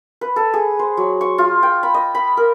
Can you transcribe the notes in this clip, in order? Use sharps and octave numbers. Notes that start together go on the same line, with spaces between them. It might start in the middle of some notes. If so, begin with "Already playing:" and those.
B4
A4
G#4
C5
F#3
C#6
F4
G5
B5
D#5
B5
A#4